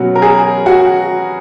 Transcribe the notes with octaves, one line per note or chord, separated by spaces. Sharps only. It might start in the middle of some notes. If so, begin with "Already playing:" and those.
Already playing: B2 F#3 C#4 F#4
A#4
G#4
F#4